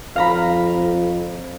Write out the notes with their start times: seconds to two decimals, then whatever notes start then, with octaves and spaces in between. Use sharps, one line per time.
0.16 F2 F5 A#5 B5